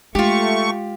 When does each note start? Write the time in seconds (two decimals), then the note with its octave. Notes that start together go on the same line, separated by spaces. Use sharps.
0.15 G#3 A3 F4 G4 C#6